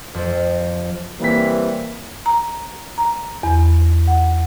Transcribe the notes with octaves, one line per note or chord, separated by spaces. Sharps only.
F2
E3 G3 A#3 C4 B6
A#5
A#5
E2
F#5